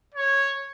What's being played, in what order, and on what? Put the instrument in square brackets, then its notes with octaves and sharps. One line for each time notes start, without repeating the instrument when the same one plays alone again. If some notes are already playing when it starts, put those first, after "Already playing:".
[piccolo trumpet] C#5